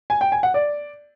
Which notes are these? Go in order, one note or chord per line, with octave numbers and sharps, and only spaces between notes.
G#5
G5
G#5
F#5
D5